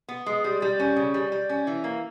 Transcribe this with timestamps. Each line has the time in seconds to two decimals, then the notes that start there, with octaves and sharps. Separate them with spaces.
0.08 B3
0.26 G#3
0.44 G3
0.62 G3
0.79 C#4
0.96 C#3
1.14 G3
1.32 G3
1.49 C#4
1.67 E3
1.84 A#3